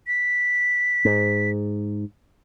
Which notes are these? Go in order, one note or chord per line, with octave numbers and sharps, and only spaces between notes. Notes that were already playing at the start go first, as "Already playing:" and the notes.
B6
G#2